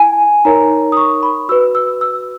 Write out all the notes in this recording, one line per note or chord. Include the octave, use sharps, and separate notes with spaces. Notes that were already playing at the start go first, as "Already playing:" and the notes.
Already playing: E4 G#5
D#4 A#4 C#5 A#5
D#6
C#6
B5
F#4 B4 E6
E6
E6